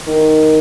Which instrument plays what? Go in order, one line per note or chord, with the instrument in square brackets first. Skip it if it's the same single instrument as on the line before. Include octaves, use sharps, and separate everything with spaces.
[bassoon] D#3